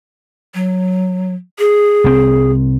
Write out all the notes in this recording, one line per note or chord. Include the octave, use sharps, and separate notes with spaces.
F#3
G#4
C2 C4